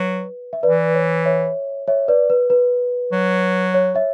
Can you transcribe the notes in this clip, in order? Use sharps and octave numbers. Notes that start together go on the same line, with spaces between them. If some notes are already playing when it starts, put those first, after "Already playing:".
Already playing: F#3 B4
E5
E3 B4 D5
C#5
C#5 E5
C#5 E5
B4 D5
B4
B4
F#3
C#5
C#5 E5